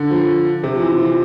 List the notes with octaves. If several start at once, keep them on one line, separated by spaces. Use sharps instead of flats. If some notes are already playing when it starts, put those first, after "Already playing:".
Already playing: D3
F3
C3
F3
E3
E3
F3